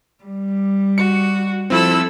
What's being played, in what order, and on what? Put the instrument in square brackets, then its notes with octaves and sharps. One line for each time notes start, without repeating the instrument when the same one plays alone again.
[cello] G3
[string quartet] F#4 [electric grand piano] C#7
[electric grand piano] F3 C4 [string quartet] E4 A4 E6